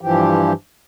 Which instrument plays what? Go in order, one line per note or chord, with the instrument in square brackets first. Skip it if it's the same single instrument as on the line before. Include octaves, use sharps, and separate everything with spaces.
[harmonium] G2 E3 F3 G4